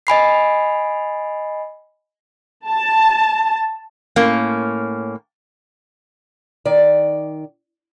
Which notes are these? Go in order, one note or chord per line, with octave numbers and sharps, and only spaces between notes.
D#5 G#5 B5 C7
A5
A2 A#3 C#4
D#3 D5